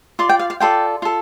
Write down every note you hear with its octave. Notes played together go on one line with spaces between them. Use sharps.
F4 D5 C6
G5
F5
F5
F4 A4 D5 G5
F4 A4